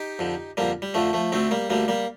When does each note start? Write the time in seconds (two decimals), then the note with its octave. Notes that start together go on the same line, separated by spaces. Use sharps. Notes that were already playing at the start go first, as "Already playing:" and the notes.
Already playing: D#4 G4
0.19 F2 D3
0.57 F2 D3 G3 A#3
0.82 G3
0.94 F2 D3 F3 A3
1.13 F3 A3
1.32 D2 D3 A3 C4
1.51 G3 A#3
1.70 D2 D3 G3 A#3
1.88 G3 A#3